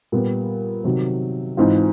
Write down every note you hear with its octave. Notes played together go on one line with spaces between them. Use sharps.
A#2 G3 B3
C3 D#3 F#3
G#2 E3 G#3 C4 F4